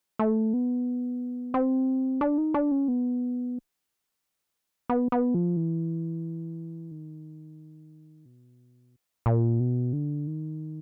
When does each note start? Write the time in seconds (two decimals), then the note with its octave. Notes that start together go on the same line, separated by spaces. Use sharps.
0.19 A3
0.53 B3
1.54 C4
2.21 D4
2.38 D#4
2.54 D4
2.71 C#4
2.88 B3
4.89 B3
5.12 B3
5.34 F3
5.57 E3
6.91 D#3
8.25 B2
9.26 A#2
9.60 B2
9.93 D3
10.27 D#3